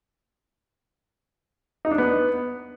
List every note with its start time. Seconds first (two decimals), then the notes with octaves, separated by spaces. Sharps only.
1.85 D#4
1.91 D4
1.98 B3